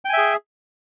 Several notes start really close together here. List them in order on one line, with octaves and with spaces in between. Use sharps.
G5 G#5 E5 G#4